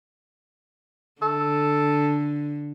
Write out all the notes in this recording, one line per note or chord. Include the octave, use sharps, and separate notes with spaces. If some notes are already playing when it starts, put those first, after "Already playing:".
D3 A4